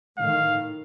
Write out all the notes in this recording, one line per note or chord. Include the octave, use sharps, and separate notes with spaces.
A2 D#3 F5